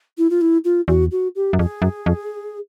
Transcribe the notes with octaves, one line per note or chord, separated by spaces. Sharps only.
E4
F4
E4
F4
E2 F#4
F#4
G4
F#2
F2 G#4
F#2
F2